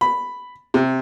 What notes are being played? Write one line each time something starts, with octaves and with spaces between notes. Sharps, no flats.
B5
C3